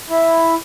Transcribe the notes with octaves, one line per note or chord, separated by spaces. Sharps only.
E4